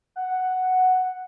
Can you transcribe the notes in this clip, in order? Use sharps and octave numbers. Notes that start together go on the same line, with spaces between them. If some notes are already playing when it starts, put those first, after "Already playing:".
F#5